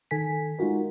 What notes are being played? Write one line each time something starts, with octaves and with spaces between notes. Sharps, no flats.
D#3 A4 G#5 B6
G#3 D#4 F4 F#4 A#4